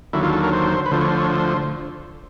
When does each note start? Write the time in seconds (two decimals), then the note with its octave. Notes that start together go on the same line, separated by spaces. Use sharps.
0.13 D#2 D3 F#3 E4
0.23 F4
0.33 A4
0.43 A#4
0.53 C5
0.86 B4
0.91 D2 D3 F3 C5
1.01 C#5
1.11 C5
1.20 C#5
1.30 C5